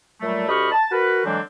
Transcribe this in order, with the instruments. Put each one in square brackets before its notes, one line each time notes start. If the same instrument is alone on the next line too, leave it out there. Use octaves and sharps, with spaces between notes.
[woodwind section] A#2 F#3 G3 A3
D2 G4 D#5 B5 C#6 F6
A5
F#4 A#4 B4
D3 E3 F#3 G#3 C4 D4